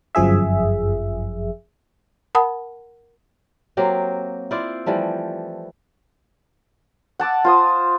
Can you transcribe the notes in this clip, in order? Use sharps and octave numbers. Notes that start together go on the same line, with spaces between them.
G1 F#2 F3 G#4 E5
A#4 F#5 A5 B5 D#6
F#3 A#3 C4 G4
E4 F4 C5 D5
E3 F3 G3 A3
F#5 A5 D6 E6
F4 C5 D#6